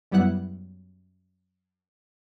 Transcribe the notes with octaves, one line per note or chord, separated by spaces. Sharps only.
F#2 G3 B3 E4 F#5 F#6